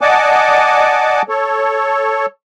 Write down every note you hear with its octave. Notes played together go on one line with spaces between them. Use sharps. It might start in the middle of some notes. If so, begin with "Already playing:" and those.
D5 D#5 F#5 G#5 A5 D6
A4 C#5